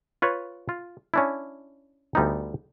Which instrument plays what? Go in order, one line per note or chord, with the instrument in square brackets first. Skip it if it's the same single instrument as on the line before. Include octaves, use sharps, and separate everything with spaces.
[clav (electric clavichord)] F4 B4 C#5
F4
C#4 D4 E4
D2 G3 B3 D#4